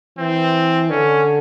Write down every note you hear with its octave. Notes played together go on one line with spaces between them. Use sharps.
E3 C4
D3 C#4